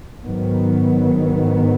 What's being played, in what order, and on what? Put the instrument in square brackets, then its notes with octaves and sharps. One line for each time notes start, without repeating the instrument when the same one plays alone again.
[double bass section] G#2 D#3 F#3 B3